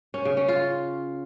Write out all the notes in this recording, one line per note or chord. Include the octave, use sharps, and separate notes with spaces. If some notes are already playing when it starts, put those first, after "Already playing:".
C#4
C#3
C#4
F4